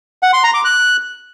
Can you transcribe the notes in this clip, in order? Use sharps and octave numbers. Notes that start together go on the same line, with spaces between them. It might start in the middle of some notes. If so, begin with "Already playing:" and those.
F#5
C6
A#5
D6
F#6